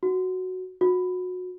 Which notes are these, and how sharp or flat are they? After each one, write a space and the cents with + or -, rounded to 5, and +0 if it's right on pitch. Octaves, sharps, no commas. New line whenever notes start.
F#4 +0
F#4 -25